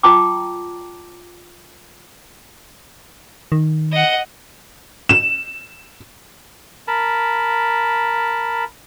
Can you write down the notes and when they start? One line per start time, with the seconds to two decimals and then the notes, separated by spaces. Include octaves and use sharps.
0.03 F4 G5 A5 A#5 D6
3.52 D#3
3.93 D#5 F#5
5.09 E7
6.88 A#4 A5 B5